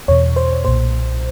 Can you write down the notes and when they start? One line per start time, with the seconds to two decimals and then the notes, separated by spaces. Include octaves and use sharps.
0.08 E2 B2 C#5
0.36 C5
0.65 B1 A#2 C5